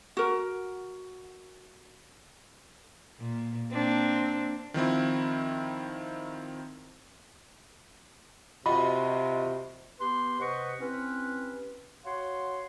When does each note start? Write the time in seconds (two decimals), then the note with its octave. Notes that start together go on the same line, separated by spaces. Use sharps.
0.17 F#4 A#4
3.20 A#2
3.72 A#3 C4 D4
4.74 D#3 F3 C4 E4
8.66 C3 F4 F#4 D#5 B5
10.00 B3 G4 B4 C6
10.40 C3 B4 C5 D#5 F#5 C#6
10.79 C4 C#4 E4 G4 B4
12.05 F#4 C#5 F5 F#5 C6